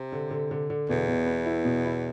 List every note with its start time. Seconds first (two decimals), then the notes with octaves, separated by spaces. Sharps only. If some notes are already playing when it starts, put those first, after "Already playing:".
Already playing: C3
0.12 D3
0.31 D3
0.51 D3
0.70 D3
0.89 E2 B2
1.08 B2
1.26 B3
1.46 E4
1.65 B2
1.85 E4